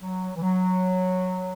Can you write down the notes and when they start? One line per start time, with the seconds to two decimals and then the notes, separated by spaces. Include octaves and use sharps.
0.01 F#3
0.36 E3
0.42 F#3